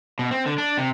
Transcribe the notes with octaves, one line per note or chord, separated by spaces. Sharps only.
B2
C4
D3
D4
C3